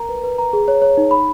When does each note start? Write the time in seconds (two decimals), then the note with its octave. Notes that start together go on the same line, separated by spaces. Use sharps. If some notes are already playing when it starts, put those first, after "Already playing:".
Already playing: A#4 A#5
0.09 B4
0.24 B4
0.38 A#5
0.53 G#4
0.68 C#5
0.82 C#5
0.97 D#4
1.11 B5